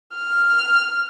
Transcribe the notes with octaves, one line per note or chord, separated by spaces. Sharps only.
F6